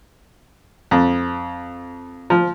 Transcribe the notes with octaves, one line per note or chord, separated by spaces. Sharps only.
F2
F3